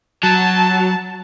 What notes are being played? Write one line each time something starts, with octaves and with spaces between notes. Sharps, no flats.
F#3 A5